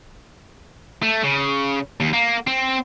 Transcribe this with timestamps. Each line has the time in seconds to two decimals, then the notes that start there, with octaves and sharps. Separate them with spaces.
1.03 A3
1.24 C#3
2.00 D#2
2.13 A#3
2.47 C4